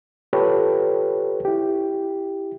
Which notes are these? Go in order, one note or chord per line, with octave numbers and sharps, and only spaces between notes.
F4 G4 A4 B4 C#5
E4 G4